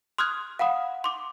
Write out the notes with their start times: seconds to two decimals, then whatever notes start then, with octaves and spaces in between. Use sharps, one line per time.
0.18 C6 D#6 F6 F#6 G#6
0.59 F5 F#5 B5 D#6
1.04 C6 D6